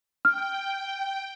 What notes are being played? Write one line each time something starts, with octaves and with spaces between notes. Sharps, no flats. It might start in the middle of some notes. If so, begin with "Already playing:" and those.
G5 F6